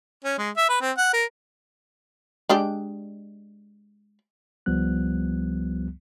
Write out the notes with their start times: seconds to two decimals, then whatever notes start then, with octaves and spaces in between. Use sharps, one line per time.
0.24 C#4
0.38 G#3
0.57 E5
0.69 B4
0.81 C4
0.97 F#5
1.13 A#4
2.49 G#3 D4 G4
4.66 C#2 F3 G3 B3 F#6